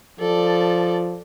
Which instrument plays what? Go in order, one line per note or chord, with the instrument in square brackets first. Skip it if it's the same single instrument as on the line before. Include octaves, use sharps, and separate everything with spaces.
[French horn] F3 [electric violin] A4 D5